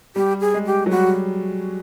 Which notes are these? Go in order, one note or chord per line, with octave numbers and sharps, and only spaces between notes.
G3 G4
G#4
G#3
G4
F#3
G3 F#4